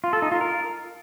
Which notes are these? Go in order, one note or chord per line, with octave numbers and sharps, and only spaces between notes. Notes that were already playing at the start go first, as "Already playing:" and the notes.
F4
A4
D#4
F4
A#4